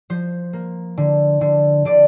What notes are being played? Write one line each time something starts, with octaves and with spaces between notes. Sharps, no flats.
F3 C5
A#3
D3
D3
D3 D5